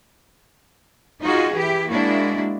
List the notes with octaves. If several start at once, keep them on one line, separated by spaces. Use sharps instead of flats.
D#4 F4 F#4 G#4
E3 E4 G4
G#3 A#3 D4 E4 F#4